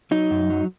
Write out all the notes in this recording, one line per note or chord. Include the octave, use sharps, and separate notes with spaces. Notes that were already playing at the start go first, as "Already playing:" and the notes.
F#3 D#4
F#2
F#3